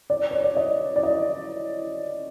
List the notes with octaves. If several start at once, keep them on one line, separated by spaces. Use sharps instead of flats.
D5
C#5
D5
D#5
D5
D#5